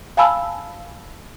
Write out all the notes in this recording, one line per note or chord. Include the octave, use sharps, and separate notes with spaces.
F5 G#5 A5 B5 E6 F6